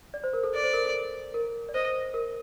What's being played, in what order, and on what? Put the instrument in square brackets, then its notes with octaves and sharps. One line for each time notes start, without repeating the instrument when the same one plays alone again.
[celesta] D5
C5
A#4
A4
[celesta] A4 [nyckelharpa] D5
[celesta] C5
A#4
A4
A#4
D5
[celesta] C5 [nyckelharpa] D#5
[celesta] A#4